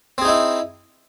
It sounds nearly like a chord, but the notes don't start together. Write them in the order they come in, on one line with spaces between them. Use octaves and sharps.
C4 G#4 D#4 E4